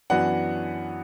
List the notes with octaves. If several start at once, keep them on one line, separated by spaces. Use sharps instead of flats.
F#2 E3 B3 D4 F#4 F#5